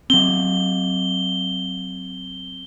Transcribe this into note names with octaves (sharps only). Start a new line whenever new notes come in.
F#3 C4 G7